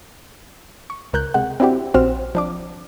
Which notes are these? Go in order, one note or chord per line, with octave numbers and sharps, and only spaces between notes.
C#6
C#2 A#4 F#6 G6
C3 G#3 F#5
C4 D4 E4 F#4 G4
A#1 C4 F#4 C5 F6 E7
F3 D4 D6